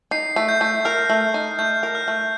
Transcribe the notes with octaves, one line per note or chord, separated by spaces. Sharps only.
D#4 C7
A3
G6
A3
A#4 F6
A3
D#4
A3 G6
A#4
F6
A3